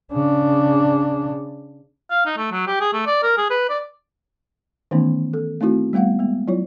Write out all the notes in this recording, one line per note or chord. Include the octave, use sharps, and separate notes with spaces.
C#3 D4
F5
D#4
A3
F#3
G4
G#4
A3
D5
A#4
G#4
B4
D5
D#3 E3 A3 B3 C#4 D#4
A4
A3 C4 D#4 E4 F#4
G3 A3 B3 F5 F#5
G#3 B3
F#3 E4 F4 C#5